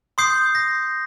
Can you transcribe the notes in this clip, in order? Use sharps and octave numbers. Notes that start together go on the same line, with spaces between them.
C6 D#6 G6 C7
A#6